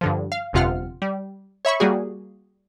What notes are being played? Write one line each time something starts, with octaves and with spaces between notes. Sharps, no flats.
G2 D3 F3
F5
G1 F2 C3 F4 F#5 F6
G3
C#5 E5 B5 C#6
G3 A#3 F#4 G#4